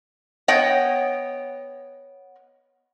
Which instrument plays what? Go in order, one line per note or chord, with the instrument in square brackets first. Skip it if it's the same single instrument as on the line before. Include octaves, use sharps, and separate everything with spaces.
[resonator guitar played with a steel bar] B3 C#5 D#5 G5